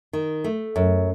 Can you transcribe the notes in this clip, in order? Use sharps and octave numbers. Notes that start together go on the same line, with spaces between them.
D#3
A3
F#2